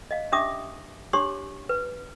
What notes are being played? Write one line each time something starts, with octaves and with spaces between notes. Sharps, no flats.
D#5 F5
C#4 D4 G4 E5 D6 D#6
D4 G4 C#5 C6 D6
B4